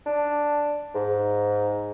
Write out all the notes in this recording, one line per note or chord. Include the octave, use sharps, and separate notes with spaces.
D4
G#2